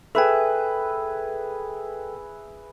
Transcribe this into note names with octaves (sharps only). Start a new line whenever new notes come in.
G#4 A4 B4 E5 G5